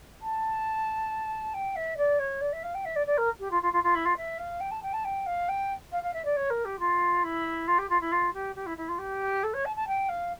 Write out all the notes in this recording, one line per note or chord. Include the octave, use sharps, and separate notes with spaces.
A5
G5
E5
D5
C#5
D5
E5
F5
G5
E5
D5
D5
A#4
G4
F4
F4
F4
F4
E4
F4
E5
F5
G5
A5
G5
A5
G5
F5
G5
F5
F5
E5
D5
C#5
A#4
G4
F4
E4
F4
G4
F4
E4
F4
G4
G4
E4
E4
F4
G4
A4
C#5
A5
A5
G5
F5